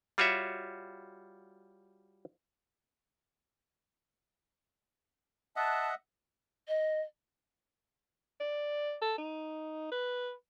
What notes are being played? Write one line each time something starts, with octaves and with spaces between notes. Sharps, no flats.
G3 F4 F#4 C#5 E5
D#5 E5 F#5 A5 F#6
D#5
D5
A4
D#4
B4